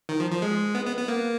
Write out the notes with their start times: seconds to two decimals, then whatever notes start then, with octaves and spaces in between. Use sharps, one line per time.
0.09 D#3
0.20 F3
0.31 F3
0.42 G#3
0.75 B3
0.86 B3
0.97 B3
1.08 A#3